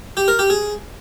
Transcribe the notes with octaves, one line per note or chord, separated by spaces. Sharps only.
G4
A#4
G4
G#4